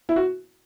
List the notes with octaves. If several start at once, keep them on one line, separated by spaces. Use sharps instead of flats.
E4
F#4